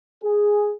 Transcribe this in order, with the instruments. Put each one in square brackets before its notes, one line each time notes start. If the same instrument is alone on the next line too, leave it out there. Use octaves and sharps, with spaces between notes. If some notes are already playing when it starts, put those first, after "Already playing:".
[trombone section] G#4